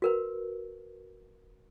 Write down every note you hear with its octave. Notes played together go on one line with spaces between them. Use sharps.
F#4 A#4 B4